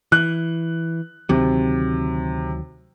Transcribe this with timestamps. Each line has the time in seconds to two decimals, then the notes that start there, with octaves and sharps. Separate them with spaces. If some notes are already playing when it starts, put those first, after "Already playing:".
0.12 E3 F#6
1.29 D2 C3 D#3 F#3